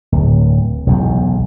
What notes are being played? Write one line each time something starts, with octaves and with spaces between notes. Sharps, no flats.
D1
E1 B1 E2